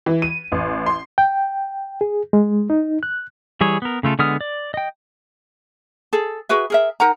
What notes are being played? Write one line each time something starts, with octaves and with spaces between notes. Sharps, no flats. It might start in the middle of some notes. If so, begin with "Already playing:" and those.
E3
D#7
A1
C6
G5
G#4
G#3
D#4
F#6
E3 G3 G#4 C#5
B3 A#4
C#3 A3 F4 A4
D3 G#3 B3 D#6 F6
D5
D#5 G5
G#4 A4
F#4 G#4 B4 E5
G#4 A#4 E5
D#4 A#4 F#5 A#5